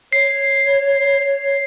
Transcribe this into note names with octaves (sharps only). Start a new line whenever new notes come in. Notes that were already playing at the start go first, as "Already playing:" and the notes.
C#5 C7